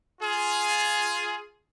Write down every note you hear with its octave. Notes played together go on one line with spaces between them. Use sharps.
F4 G#4